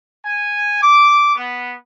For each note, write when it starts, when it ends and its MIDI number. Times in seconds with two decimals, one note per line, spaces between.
0.24 0.77 80
0.82 1.34 86
1.36 1.75 59